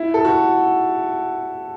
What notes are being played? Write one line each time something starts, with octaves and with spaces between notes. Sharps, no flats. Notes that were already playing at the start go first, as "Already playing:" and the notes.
Already playing: E4
A4
F#4